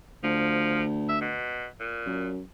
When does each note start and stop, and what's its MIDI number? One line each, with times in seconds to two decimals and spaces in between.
0.24 1.35 38
0.24 0.83 53
1.09 1.19 76
1.22 1.66 47
1.80 2.29 46
2.07 2.40 42